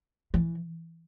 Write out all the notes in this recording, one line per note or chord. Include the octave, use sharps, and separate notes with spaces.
E3